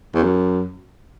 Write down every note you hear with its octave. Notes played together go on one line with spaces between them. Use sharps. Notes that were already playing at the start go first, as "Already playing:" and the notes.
E2
F#2